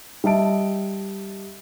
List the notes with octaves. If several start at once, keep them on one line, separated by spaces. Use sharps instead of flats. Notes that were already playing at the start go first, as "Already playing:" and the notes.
G3 D#5 E5 A5 D7